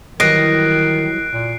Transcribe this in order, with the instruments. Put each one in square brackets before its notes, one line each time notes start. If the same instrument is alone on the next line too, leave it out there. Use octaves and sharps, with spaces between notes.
[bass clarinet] D#3 [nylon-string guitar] E3 F#3 G3 [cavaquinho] D#5 [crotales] F#6 C7 D7
[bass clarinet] A#2